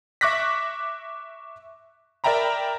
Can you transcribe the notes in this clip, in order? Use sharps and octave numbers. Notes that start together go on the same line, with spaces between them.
E5 C#6 D6 F#6 A#6 B6
A#4 D5 E5 G5 A#5 B5